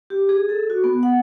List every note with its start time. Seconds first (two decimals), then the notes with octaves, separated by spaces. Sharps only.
0.10 G4
0.29 G#4
0.49 A4
0.70 F#4
0.84 B3
1.03 F#5